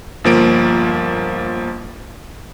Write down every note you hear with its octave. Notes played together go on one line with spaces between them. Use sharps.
G1 F3 A#3 D7